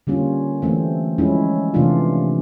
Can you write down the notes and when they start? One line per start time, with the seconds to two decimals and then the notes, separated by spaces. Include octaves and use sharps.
0.07 D3 G3 A#3 C#4 F4
0.62 E3 A3 C4
1.18 F3 G#3 C#4 E4
1.74 C3 E3 A3 D4 F4